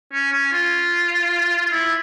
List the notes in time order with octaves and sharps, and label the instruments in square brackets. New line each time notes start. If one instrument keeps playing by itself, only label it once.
[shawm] C#4
C#4
F4
F4
E4